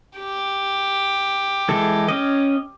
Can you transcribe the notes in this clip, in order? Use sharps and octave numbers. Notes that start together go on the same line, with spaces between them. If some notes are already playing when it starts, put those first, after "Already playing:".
G4
E3 G#3 A4
C#4 D#5